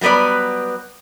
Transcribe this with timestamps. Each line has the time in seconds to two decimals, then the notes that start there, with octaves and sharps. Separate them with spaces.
0.01 F#3 G3 B3 B4 D5